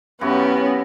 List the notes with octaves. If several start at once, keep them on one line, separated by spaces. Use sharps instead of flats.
F#2 B3 C#4 E4 F#4 G4